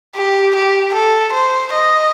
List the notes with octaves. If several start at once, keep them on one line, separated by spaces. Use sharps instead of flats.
G4
G4
A4
C5
D#5